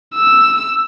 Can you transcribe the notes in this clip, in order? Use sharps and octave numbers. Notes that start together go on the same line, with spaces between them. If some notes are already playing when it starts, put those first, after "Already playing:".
E6